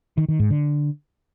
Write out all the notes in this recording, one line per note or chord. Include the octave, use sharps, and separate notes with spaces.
D#3
D#3
G#2
D3